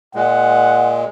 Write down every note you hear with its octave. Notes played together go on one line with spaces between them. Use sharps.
A#2 G#3 F#5